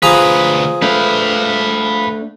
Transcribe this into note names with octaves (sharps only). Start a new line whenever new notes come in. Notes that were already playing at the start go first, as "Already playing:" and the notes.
D2 F3 G#4 B4 A#5
A3 D4 B4 F5